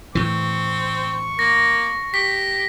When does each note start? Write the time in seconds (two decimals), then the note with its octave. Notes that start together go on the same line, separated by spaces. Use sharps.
0.15 A2 E3 C4 C#6
1.39 A#3 A#6
2.14 G4 B6